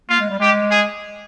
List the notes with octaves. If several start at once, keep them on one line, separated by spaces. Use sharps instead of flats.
A#3 F4
G#3
G3
G#3 G4
G#4